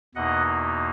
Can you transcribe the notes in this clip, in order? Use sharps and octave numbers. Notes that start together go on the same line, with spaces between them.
E2 B2 A#3 D#4 D#5 F#5